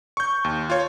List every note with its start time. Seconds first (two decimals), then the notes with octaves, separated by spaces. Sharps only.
0.17 C#6 G6
0.44 D#2
0.70 F4 C#5